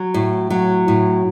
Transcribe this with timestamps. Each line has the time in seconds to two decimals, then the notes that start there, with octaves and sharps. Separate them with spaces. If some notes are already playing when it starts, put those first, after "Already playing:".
Already playing: F#3
0.14 A2
0.50 F#3
0.88 A2